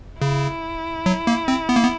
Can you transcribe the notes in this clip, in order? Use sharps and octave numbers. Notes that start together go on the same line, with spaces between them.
C#3 E4
F#3
A#3
C4
B3
A#3
B3